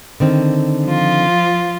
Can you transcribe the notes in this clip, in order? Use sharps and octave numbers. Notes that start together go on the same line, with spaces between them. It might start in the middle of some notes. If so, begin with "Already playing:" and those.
D3 D#3 C4
F3 F4